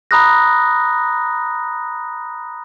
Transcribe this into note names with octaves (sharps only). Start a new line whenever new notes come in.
A#5 B5 D#6 F#6 A#6